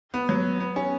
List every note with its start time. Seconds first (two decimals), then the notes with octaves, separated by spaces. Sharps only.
0.14 B3
0.29 F#3
0.60 B3
0.76 C#4